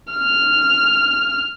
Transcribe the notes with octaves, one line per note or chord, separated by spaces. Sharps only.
F6